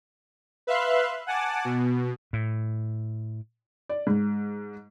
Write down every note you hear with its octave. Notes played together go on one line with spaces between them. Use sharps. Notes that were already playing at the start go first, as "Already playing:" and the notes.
B4 E5 F5 C6 F#6
F#5 G#5 A5 D6
B2
A2
D5
G#2